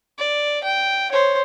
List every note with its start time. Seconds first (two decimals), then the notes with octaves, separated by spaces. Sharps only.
0.18 D5
0.63 G5
1.11 C5 C#5